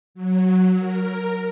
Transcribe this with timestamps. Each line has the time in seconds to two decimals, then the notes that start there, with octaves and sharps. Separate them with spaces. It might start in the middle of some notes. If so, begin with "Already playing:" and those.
0.14 F#3
0.79 A#4